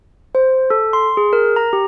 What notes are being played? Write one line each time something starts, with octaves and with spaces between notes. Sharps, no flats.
C5
A4
C6
G#4
A#4
A#5
G4